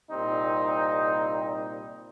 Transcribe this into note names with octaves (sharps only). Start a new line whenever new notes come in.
C2 A#2 G3 C4 D#4